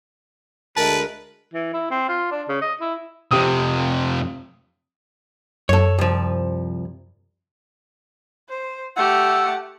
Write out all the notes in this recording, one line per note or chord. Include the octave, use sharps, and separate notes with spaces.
D2 G#3 A#4 B4 A5
E3
E4
C4
F4
D4
C#3
D#5
E4
F2 C3 G4 D#6
F#2 A4 C#5
C2 F3
C5
A3 G4 F#5 E6